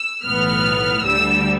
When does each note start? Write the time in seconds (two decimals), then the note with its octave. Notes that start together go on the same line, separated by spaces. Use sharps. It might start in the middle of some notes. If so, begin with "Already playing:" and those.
Already playing: E6
0.24 B1 A2 E3 B3 F6
1.04 D2 D3 G3 E6